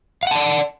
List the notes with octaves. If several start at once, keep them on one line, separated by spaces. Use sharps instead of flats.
D5 F5 F#5 A5